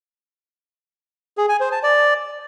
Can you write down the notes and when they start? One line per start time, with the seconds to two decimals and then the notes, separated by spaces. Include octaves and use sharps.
1.38 G#4
1.49 G#5
1.60 C5
1.72 A5
1.83 D5